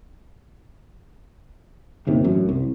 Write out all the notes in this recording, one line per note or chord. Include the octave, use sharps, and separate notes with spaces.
G1 D#2 C3
A1 F#2
C2